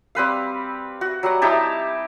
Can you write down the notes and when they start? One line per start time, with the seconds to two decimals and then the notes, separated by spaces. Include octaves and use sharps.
0.15 G3 C4 B4 F5
1.01 F#4
1.23 F#3 G3 F#5
1.42 D#4 E4 G4 A5